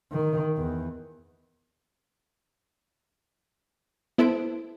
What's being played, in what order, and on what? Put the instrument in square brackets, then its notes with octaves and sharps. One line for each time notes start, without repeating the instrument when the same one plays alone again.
[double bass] D#3
E2
[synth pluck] B3 E4 A4 C5 D7